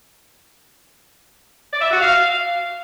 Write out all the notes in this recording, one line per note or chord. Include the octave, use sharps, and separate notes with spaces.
D5
E5
F#4
F5